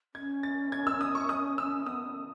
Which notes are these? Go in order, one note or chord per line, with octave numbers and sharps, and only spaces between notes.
C#4 G#6
A6
G#6
E6
D#6
C#6
D#6
E6
B3 D#6
C#4